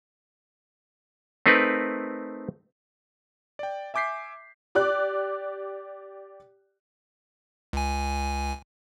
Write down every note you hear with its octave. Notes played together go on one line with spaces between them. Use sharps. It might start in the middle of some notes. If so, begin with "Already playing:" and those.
A3 C4 D#4 A#4 B4
D5 G5
E5 G#5 D6 G6 B6 C7
G4 D5 D6 F#6
C#2 G#5